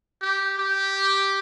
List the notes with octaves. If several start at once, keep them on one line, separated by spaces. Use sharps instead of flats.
G4
G4